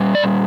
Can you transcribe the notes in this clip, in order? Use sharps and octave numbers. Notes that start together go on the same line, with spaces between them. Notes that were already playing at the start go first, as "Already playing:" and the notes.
Already playing: A#2 G3
D5